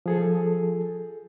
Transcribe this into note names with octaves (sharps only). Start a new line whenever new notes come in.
F3 G#4 A4